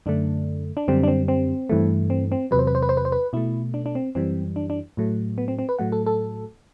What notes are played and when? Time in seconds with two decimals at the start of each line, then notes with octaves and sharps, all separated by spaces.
0.06 F#2 D3 A3 D4
0.77 D4
0.88 F#2 D3 G3 C4
1.03 D4
1.08 C4
1.28 C4
1.70 G2 E3 A3
2.10 C4
2.32 C4
2.51 E2 C3 F#3 B4
2.59 C5
2.67 B4
2.75 C5
2.82 B4
2.89 C5
2.97 B4
3.05 C5
3.12 B4
3.33 B2 A3 E4
3.74 D4
3.86 D4
3.95 C4
4.15 F#2 E3 G3 C4
4.56 D4
4.70 D4
4.97 A2 F#3 A3
5.38 B3
5.48 C4
5.59 C4
5.69 B4
5.79 A2 F#3 A3 F#5
5.92 A4
6.06 A4